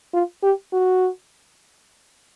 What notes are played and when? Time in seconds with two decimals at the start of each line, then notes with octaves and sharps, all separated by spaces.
0.14 F4
0.43 G4
0.73 F#4